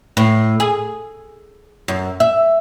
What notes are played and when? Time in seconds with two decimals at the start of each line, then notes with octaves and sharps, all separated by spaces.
0.17 A2
0.60 G#4
1.88 F#2
2.20 E5